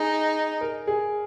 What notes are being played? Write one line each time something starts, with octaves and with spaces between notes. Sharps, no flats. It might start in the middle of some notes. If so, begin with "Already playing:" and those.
Already playing: D#4 G#4
A#4
G#4